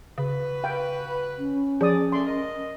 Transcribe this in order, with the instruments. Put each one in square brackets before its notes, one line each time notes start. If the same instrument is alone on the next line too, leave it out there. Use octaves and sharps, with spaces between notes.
[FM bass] C#3 [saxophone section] F#4 B4
[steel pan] F5 G5
[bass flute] C#4
[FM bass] F3 [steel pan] G#4 D5 D#6
[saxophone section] A3 D5 E5 [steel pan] C6
[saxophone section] A#4 D#5